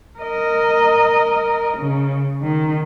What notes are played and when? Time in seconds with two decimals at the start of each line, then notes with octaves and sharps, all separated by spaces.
0.19 A#4 D#5
1.77 C#3
2.42 D#3